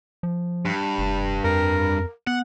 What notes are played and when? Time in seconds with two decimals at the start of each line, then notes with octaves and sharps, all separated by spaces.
0.23 F3
0.65 G2
0.98 F1
1.44 F2 A#4
2.27 B3 F#5